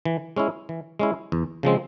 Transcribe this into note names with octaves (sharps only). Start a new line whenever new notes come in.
E3
G#3 C#4 E4
E3
G#3 C#4 E4
E2
C#3 F3 G#3 C4